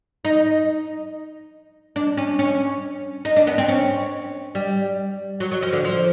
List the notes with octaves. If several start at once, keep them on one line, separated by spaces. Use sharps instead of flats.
D#4
D4
C#4
C#4
D#4
D4
B3
C4
C#4
G3
F#3
F#3
F3
D3
F3